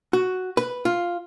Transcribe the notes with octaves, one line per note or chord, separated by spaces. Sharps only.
F#4
B4
F4